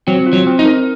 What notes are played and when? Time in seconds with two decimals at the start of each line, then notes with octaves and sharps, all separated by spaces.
0.07 F#3 C4
0.26 F4
0.33 F#3
0.47 C4
0.59 D#4
0.66 A#4